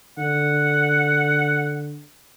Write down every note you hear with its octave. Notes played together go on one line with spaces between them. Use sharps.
D3 F#5